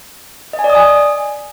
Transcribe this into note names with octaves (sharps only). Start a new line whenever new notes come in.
D#5
G#5
D5
D#6
G#5